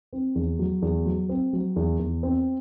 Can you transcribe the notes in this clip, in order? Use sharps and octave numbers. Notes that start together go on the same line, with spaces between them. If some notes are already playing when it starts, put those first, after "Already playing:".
C4
E2
F#3
E2
F#3
C4
F#3
E2
E2
C4